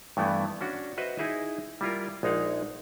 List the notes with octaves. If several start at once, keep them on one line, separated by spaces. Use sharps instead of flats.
G2 E3 A3 B3 E4
C#4 D4 F#4
F#4 B4 C5 D#5 E5
D#4 E4 G#4 E5
G3 E4 F4 A#4
A#1 G#3 D#4 F5 F#5